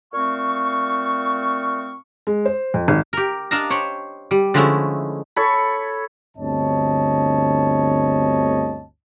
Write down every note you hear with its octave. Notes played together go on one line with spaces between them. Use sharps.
A#2 A3 C4 F5 C#6
G#3
C5
F2
G#1
G4 A#4
D4 A#4 D#5 F5 A5 A#5
C5 C#5 G5 B5
G3
D3 F3 G#3 A3 C#4 E4
A4 C#5 B5
G1 D2 C4 C#5 D#5 A5